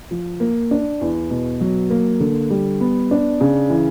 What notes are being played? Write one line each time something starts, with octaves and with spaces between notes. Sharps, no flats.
F3
A#3
D4
E2
B2
F#3
A#3
D3
G3
B3
D4
C#3
E3